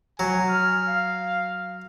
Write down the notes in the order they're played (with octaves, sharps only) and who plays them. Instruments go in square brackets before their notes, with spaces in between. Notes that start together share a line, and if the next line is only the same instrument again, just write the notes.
[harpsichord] F#3 [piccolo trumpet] G#5
[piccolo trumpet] F6
F5